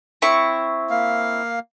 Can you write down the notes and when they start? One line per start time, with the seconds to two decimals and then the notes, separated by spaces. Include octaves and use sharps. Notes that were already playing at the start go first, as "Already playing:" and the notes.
0.22 C4 E4 C#6
0.90 A#3 F5